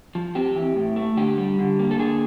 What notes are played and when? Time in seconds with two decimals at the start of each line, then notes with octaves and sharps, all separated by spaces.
0.15 F3
0.35 C4 G4
0.55 E3
0.76 A2
0.96 A3
1.17 D3 G4
1.38 G3
1.59 D3
1.79 A#3
1.91 A4
1.99 D3 G#4